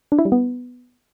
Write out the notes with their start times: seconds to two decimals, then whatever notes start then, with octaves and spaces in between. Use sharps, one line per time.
0.12 D4
0.19 E4
0.25 G3
0.32 B3